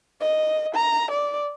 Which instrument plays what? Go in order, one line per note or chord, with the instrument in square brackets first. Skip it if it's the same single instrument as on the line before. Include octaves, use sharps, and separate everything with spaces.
[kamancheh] D#5
A#5
D5